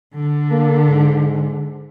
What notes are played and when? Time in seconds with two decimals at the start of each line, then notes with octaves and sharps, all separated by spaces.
0.15 D3
0.51 A#3
0.88 G#2